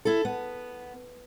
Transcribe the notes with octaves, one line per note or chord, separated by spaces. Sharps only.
E4 A4
B3